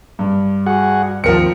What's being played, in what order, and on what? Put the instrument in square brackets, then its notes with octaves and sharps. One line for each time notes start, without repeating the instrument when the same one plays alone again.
[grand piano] G2
[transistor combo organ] F#4 G#4 F#5
[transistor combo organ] D#2 C4 [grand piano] F3 A#4 C#7